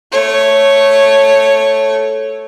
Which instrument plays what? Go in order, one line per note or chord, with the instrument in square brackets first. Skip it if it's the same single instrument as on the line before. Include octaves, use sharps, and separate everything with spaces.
[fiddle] A3 C#5